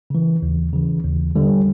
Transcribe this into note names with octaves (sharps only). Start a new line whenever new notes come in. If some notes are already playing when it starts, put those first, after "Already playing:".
C#3 E3
D#2
C#3 E3
D#2
D3 G3